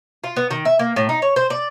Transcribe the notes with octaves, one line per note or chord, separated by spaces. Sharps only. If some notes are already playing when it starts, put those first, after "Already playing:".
F4
B3
D#3
E5
A#3
A2
D#4
C#5
C5
D5